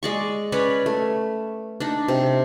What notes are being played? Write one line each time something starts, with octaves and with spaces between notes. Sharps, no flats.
G#3 D5 C#6
C#4 B4 C#5 D5
A3
D4 D#4
C3